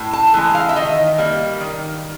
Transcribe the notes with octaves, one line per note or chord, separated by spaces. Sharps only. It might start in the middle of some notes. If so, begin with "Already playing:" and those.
Already playing: A2
A5
E3 G#3
F5
E5
D#3 D#5
G3 A#3
D#3